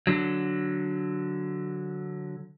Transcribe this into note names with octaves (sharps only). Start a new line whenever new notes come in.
D3 F#3